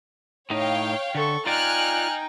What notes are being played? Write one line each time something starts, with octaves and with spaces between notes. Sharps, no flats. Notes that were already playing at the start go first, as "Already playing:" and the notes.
A2 D#4 C#5 F5 G5
D3 A4 C#6
D#4 F4 D5 G5 G#5 F6 F#6